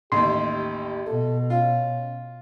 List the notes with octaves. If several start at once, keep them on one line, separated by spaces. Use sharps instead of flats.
A1 D#2 G4 C6
B2 A4
C#4 F4